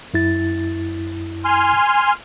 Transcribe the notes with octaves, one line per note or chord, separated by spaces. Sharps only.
F#2 E4 A6
G#5 C6 F6